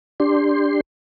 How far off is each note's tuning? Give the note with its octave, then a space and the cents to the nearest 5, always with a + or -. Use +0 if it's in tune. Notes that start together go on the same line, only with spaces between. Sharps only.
D4 +0 G4 +20 C6 +0